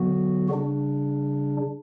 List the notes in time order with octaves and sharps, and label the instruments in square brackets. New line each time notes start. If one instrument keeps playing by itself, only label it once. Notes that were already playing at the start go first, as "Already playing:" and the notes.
Already playing: [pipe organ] D3 F#3 B3 F#4
C#3 G3 D4